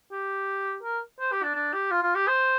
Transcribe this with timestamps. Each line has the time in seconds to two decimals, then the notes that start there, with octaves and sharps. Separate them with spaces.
0.12 G4
0.83 A#4
1.20 C5
1.32 G4
1.43 D4
1.55 D4
1.73 G4
1.91 F4
2.03 F4
2.15 G4
2.28 C5